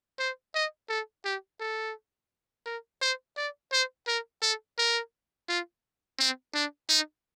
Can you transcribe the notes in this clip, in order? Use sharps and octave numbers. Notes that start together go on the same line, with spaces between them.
C5
D#5
A4
G4
A4
A#4
C5
D5
C5
A#4
A4
A#4
F4
C4
D4
D#4